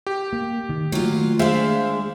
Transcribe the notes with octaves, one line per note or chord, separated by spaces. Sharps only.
G4
A#3
D#3
D#3 F#3 A3 A#3 F4
G#3 D4 C5 E5 F5